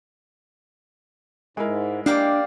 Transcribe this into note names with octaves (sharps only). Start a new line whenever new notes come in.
G#2 G#3 E4 A#4
A#3 D4 G4 D5 F5